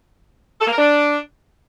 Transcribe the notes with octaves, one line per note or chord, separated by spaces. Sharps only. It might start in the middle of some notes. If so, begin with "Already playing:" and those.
A4
A#3
A#4
D4